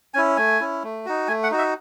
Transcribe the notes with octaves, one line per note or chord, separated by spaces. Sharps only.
C#4 E4 G#5
A3 G#5
C#4 E4
A3
D#4 F#4
A3 G#5
F#5
D#4 F#4
E5